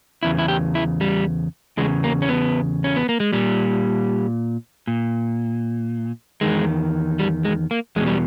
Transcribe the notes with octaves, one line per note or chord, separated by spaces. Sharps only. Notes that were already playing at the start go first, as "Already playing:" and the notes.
E2 C#3 E4
E4
G4
E4
G3
E2 C#3 G#3
A#3
C#4
B3
C#4
B3
A#3
G#3
A#2 G3
A#2
E2 D#3 G#3
G3
G#3
A#3
E2 B2 G#3
G3